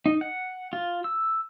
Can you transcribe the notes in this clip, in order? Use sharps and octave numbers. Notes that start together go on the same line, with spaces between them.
D#4
F#5
F4
E6